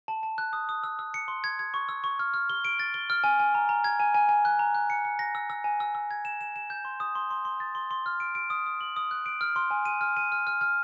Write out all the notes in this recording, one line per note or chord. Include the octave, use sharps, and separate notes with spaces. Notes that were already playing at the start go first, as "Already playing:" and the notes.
A5
A5
F#6
D#6
D#6
E6
E6
C#7
C6
G#6
G#6
C#6
E6
C#6
F6
F6
G7
D7
A6
G7
F6
G#5
G#5
A#5
A#5
G#6
G#5
G#5
G#5
F#6
A#5
F#6
C#7
C#7
A#6
E6
E6
G#5
E6
E6
G#6
E7
E7
E7
G6
C6
D#6
C6
C6
C6
A6
C6
C6
F6
D7
D7
D#6
D#6
F#7
D#6
F#6
D7
F6
C6
G#5
D#7
F6
D#7
F6
F6
F6